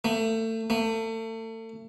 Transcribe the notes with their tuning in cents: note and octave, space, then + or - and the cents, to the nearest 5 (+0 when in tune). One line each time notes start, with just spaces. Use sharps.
A3 +30
A3 +35